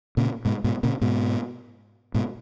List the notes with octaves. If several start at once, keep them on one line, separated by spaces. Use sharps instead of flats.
A#2 C#3
G#2 B2
G#2 B2
A#2 C#3
G#2 B2
G#2 B2